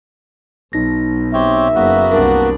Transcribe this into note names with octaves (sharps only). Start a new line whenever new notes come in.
B1 D#4 A#6
C4 G4 C#5 E5
F#1 A#3 B3 F#4
C2 D4 A#4